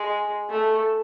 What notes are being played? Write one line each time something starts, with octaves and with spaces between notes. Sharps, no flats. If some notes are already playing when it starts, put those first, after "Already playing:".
Already playing: G#3
A3